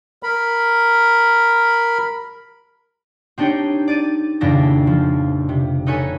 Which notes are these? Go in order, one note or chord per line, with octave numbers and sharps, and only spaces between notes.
A#4 B5
C4 D4 D#4 G4 C#5 G5
D5 A6 D#7
D#1 F2 C#3 D4 E4 A#6
F3
C3
D#4 A4 B4 C#5 G#5